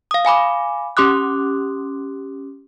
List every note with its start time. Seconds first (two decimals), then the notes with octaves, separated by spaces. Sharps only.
0.11 F5 D#6
0.25 F5 G#5 B5 D6
0.97 C#4 G4 C6 D6 D#6 F#6